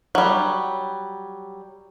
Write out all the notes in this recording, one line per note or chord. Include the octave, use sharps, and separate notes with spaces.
F#3 G3